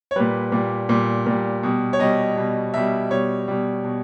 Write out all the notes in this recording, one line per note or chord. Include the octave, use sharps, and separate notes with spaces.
C#5
A#2 G3 B4
A#2 G3
A#2 G3
A#2 G3
B2 G3
C#5
B2 G3 D#5
B2 G3
B2 G3 E5
B2 G3 C#5
B2 G3
B2